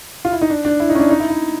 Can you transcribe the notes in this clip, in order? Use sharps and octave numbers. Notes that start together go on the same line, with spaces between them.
F4
E4
D#4
D4
D4
E4
D#4
C#4
D4
D#4
E4
E4